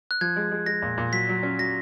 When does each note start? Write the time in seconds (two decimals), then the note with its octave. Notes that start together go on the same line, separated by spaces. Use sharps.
0.11 F#6
0.21 F3 G#6
0.36 G#3
0.51 G#3
0.66 G#3 A#6
0.82 A#2
0.98 A#2
1.13 F#3 B6
1.29 F#3
1.43 C#4
1.59 F#3 A#6